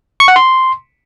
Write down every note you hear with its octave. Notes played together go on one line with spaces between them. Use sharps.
C#6
F#5
C6